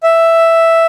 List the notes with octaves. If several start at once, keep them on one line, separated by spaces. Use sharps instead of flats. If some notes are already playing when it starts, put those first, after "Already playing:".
E5